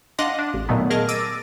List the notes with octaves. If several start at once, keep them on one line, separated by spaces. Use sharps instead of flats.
D4 D#5 F5 F#5 C6 A#6
D4
A1
A#2 D#3 F#3 A3 B3
G#4 A#4 D#5 A5 F6
D6 E6 A6 A#6 D7 D#7